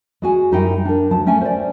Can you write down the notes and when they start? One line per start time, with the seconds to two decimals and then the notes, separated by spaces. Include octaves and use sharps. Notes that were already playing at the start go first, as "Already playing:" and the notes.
0.22 G#3 F#4 G#5
0.51 F#2 G3 D#4 E4 D#5 G5
0.85 D4 A#4
1.11 D2 F#3 A5
1.26 A3 C#4 G5 G#5
1.41 C5 D5